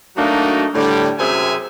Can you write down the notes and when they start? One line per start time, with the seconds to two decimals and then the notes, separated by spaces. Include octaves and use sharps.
0.17 F#3 A3 A#3 D4 D#4 F#4
0.75 A2 D3 G3
1.18 F#2 C3 C4 G#4 E5 G#5